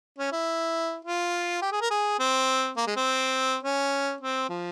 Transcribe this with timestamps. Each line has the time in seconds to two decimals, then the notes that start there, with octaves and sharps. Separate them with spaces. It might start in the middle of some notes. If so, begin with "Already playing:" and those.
0.18 C#4
0.32 E4
1.05 F4
1.62 G4
1.72 G#4
1.81 A#4
1.90 G#4
2.19 C4
2.77 A#3
2.86 G#3
2.96 C4
3.63 C#4
4.21 C4
4.49 F3